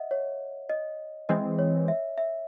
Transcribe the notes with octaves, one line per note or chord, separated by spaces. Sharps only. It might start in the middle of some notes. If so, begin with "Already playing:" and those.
Already playing: D#5 E5 F#5
C#5
D#5
E3 G#3 C4 D#5
C#5
E5
E5